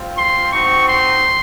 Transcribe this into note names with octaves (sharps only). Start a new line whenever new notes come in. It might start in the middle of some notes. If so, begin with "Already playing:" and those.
Already playing: C4 F4
C6
C4 D#4 F#4 C#6
C6